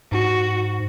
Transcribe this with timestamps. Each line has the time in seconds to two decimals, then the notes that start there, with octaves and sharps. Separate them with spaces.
0.12 G#2 F#4